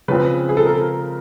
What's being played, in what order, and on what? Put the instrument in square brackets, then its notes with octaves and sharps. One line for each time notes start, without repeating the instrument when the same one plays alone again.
[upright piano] C#3 F3 G#3 C4 [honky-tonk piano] B4
[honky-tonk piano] G#4
A4
A#4